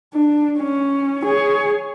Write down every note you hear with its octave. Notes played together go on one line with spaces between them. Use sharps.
D4
C#4
G#4 C#5